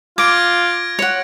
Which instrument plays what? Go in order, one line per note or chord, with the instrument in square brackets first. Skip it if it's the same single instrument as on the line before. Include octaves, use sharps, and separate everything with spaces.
[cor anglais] F4 [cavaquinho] D6 [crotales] G#6 A#6 D7
[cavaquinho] C#5 F#5